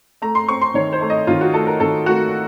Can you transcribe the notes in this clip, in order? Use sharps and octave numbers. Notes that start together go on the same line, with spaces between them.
A3 A#5
C6
C4 C#6
C6
D#3 C#5
C5
A3
D#5
D#3 F4
F#4
A3 A4
A#4
D#3 A4
A3 F#4